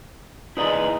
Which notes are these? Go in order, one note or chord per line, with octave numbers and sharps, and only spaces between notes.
G#3 D#4 E4 B4 D5